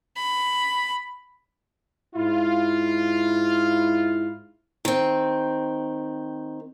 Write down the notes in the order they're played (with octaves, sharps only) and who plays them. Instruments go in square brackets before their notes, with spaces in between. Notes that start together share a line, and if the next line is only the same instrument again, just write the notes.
[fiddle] B5
[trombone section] G#2 E4 [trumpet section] F4
[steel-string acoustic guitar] D#3 C4